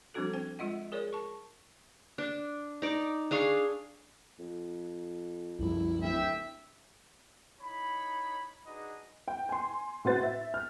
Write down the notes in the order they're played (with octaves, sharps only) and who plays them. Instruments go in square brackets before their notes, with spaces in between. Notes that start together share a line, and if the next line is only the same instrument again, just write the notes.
[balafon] F3 G3 C4 D4 F#4 A4
C4 C5 G5
G#3 F4 D#5 F#5
G#4 A#4 C#5 D5
A5 C#6
[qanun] D4
D#4 D5
D4 G#4 F5 C#6
[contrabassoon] F2
[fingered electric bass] C2 F#2 F3 [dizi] E4
[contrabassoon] D1 [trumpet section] E5 G5
[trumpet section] D#4 E4 C#5 B5
D4 D#4 F#4 G#4 B4 D#5
[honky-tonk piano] G5
G#5 C6
A2 C4 F#4 B4 C5 A6
E5
F6